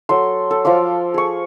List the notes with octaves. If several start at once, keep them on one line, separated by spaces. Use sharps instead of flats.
F#3 A4 C6
A4
F3 F5 C6 D6
G#4 C#6